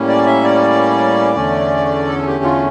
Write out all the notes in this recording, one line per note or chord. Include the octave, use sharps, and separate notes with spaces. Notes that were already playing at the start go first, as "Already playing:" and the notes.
Already playing: A2 G3 A#3 C#4
D5
E5
D5
E2 D3 A3 C#4
A4
G4
F4